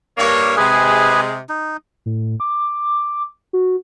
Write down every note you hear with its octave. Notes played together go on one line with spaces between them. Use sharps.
G2 A#3 C#5
C3 G#3 G#4 B4 G#5
D#4
A2
D6
F#4